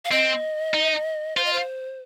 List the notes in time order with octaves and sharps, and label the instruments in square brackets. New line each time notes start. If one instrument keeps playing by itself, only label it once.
[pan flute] F5
[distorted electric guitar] C4 [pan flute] D#5
[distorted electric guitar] D#4
[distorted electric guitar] F4 [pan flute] C5
[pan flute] D#5
C5